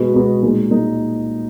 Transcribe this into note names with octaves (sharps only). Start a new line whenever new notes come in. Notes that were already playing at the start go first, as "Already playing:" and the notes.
Already playing: B2 G#3 B3 F#4 B4
B2 G#3 B3 F#4 B4
A#2 G#3 D#4
A#2 G#3 D#4